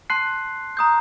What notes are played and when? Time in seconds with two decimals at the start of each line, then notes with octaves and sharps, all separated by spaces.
0.10 A5 C6 F#6 C7
0.77 A#5 D#6 G6